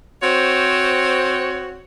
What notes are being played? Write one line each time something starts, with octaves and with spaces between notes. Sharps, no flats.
C4 F#4 C5 C#5